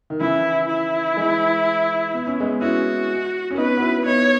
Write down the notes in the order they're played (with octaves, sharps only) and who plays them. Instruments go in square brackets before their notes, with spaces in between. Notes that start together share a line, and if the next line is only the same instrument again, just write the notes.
[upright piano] D#3
[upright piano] C#3 E3 [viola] E4
[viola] E4
[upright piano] E3 G#3
B3
C#4
G#3 B3
[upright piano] C#4 E4 [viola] F#4
[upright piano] C#4
[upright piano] B3 D#4 [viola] B4
[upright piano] F#4
C#4 E4
[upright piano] B3 D#4 [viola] C#5